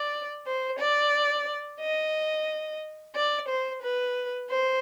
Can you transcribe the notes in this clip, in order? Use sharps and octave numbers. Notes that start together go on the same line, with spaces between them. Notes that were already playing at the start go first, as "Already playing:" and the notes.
Already playing: D5
C5
D5
D#5
D5
C5
B4
C5